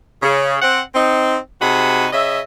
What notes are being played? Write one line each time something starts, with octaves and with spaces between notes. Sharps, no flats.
C#3
C4 F#5
C4 D#4
C3 D#4 F#4 G#4 B5
C#3 D#5 E5